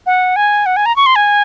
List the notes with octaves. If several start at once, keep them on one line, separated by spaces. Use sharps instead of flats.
F#5
G#5
F#5
G#5
A#5
C#6
C6
G#5